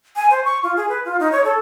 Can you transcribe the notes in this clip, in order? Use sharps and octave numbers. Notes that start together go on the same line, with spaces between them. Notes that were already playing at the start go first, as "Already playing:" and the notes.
G#5
C5
C#6
F4
G#4
B4
F4
D#4
C#5
A4